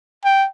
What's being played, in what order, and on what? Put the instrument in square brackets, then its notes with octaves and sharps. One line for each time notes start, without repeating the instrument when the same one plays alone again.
[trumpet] G5